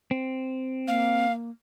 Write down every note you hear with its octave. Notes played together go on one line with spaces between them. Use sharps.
C4
A#3 F5